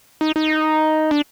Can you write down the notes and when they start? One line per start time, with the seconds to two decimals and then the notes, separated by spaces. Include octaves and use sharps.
0.21 D#4
0.36 D#4
1.11 D4